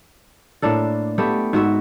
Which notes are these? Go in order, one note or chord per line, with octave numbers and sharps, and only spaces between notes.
A2 A#3 D4 A4
A3 B3 G4
G#2 F#4 E5